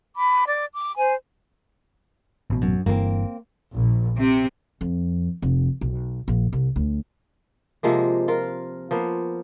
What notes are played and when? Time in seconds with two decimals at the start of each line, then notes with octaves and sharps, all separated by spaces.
0.16 B5 D6
0.47 D5 D6
0.74 D6
0.97 C5 G#5
2.50 A1 B2
2.62 F#2
2.86 G1 G2 E3 A#3 C4
3.74 A#1
4.17 C3
4.81 F2
5.42 F1
5.81 B1
6.28 A#1
6.53 C2
6.76 D2
7.83 C3 F3 G#3 A#3
8.28 F4 A#4
8.91 F3 A#3 B3